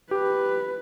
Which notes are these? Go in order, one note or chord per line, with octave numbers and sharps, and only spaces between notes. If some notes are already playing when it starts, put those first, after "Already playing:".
G4 B4